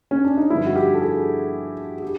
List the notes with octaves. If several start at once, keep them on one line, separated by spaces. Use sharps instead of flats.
C#4
D4
D#4
G2 D3 F3 E4
F#4
G4
A4
G#4
G#4
G4